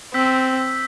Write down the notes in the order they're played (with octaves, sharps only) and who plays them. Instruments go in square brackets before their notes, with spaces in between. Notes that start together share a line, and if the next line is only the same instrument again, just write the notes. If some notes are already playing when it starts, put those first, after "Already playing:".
[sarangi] C4 [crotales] E6 G6 B6